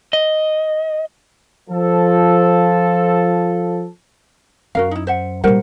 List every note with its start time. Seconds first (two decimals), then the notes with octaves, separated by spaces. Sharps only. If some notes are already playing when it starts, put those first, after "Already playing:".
0.13 D#5
1.70 F3 A4
4.75 F#2 F#4 A#4 F5
4.91 D#4 E4
5.07 C5 E5 F#5
5.44 A#1 G3 A#4 C5 F#5